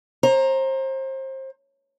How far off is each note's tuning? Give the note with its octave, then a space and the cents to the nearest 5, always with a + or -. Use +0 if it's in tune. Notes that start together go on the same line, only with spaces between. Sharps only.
C5 +30 A#5 +0